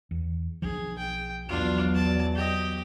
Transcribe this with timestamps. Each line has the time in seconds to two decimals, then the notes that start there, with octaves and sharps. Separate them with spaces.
0.11 E2
0.62 B1 F3 G#4
0.98 G5
1.49 E2 F#3 D4 F4
1.94 D5 A5
2.35 G4 D#5